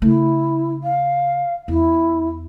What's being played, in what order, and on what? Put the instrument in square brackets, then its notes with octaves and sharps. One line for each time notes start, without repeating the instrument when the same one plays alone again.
[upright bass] C#3 A3 [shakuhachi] E4
[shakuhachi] F5
[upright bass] E2 [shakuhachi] E4